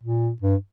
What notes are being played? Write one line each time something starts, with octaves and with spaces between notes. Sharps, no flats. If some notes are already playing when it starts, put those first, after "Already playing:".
A#2
G2